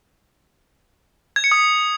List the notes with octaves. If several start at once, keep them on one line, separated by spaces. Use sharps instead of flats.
G#6
C#7
D#6